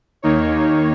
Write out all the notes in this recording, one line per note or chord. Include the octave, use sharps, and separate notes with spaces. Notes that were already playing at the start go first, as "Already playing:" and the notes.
D#2 D#3 A#3 D#4 C#5